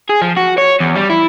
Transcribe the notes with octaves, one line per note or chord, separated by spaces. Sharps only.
G#4
F3
F#4
C#5
E2
G3
E4